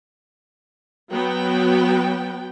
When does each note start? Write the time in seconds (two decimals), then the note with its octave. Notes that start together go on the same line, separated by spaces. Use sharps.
1.12 F#3 B3 G5